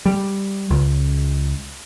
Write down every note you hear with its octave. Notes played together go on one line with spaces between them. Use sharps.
G3
C#2